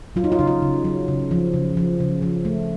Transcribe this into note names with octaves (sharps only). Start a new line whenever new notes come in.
F#3 F4
D#4
F4
C#3 D#4
F4
C#3
F#3
C#3
F3
C#3
F3
C#3
F3
A3